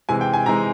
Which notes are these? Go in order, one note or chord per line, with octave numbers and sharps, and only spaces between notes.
C3 E3 G#3 G#5
G5
G#5
C3 E3 G#3 A#5